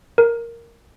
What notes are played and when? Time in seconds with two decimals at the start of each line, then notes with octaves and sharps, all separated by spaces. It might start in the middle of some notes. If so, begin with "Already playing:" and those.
0.18 A#4